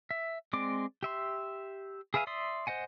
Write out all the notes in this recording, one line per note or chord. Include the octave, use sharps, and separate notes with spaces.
E5
G#3 C4 D5 D6
G4 E5 C6
G#4 B4 E5 F5 G#5
D5 E5 C6 D#6
C5 D#5 F#5 G#5